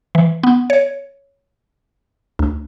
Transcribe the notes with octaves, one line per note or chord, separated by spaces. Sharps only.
E3
B3
C#5
D2